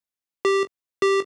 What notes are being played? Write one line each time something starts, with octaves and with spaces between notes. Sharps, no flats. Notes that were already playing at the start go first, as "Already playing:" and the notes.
G4
G4